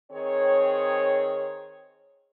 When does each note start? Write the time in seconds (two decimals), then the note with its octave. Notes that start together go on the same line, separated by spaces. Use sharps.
0.12 D#3 C4 G#4 C#5